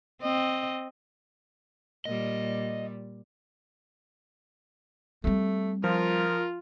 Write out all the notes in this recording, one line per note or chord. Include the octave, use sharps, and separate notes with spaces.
C4 D#5
A#2 G3 D#5
G3 A3 C4
F3 F4 A#4